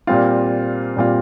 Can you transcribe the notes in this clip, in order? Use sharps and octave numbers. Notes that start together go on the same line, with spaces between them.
A#2 G3 C4 F4
A#2 G3 C4 F4